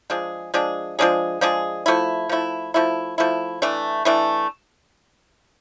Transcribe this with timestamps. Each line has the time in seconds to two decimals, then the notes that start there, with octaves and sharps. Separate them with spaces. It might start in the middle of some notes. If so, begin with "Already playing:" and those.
0.10 F3 G#3 D4 G#4
0.54 F3 G#3 D4 G#4
0.99 F3 G#3 D4 G#4
1.41 F3 G#3 D4 G#4
1.86 F3 A3 E4
2.29 F3 A3 E4
2.74 F3 A3 E4
3.18 F3 A3 E4
3.62 E3 A3 D4
4.05 E3 A3 D4